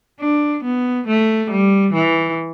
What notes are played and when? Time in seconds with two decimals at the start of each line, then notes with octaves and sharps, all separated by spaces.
0.20 D4
0.64 B3
1.07 A3
1.51 G3
1.94 E3